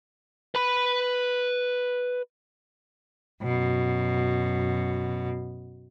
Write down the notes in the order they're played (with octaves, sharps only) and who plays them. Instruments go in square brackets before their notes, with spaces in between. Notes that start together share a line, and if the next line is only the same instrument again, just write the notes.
[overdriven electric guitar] B4 B5
[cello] F#2 B2